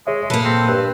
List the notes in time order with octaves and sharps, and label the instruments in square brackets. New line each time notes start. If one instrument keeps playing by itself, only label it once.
[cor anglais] G#3 [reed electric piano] G#4 C#5 E5
[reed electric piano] A#2 [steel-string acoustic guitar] A#3 A4 [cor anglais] B4
[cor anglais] C4
[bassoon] G2 [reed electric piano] F#6